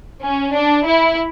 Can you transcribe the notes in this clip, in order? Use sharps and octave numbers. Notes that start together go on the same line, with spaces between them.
C#4
D4
E4